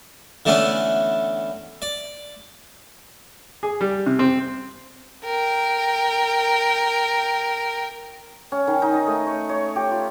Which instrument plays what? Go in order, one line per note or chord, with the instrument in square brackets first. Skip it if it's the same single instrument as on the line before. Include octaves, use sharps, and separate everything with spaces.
[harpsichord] D3 E3 A3 B3 C#4 D4
D5
[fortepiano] G#4
G3
C3
C4
[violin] A#4 G5
[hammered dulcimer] C#4
D#3
D#4
D#5
A3
C#5
C#5
G4
F4